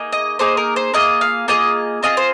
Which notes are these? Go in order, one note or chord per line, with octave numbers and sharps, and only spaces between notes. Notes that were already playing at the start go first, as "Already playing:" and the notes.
Already playing: A#3 D#4 G#4
D#5
A#3 D#4 G#4 C5
A#4
C5
A#3 F4 G#4 D#5
F5
A#3 F4 G#4 D#5
C4 F4 G#4 D#5
C5